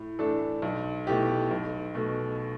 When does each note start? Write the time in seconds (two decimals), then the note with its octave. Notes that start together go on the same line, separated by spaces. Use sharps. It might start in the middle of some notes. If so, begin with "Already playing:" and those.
Already playing: A2
0.19 E3 A3 D4 A4
0.62 B1
1.07 B2 A3 E4 G4
1.51 B1
1.95 B2 A3